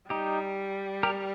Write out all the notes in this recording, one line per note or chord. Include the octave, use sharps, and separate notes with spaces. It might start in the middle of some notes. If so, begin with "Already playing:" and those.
G3 D#4 G4
G4 A#4